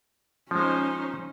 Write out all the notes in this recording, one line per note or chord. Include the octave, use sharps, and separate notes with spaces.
F3 G#3 C#4 D#4 C5